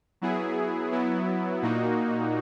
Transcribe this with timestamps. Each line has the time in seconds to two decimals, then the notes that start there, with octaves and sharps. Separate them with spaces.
0.21 F#3 B3 E4 G#4
0.92 F#3 B3 E4
1.62 A#2 A#3 D#4 F#4